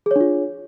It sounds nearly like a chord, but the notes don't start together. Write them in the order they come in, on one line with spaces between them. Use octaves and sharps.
G#4 C#5 D4 F4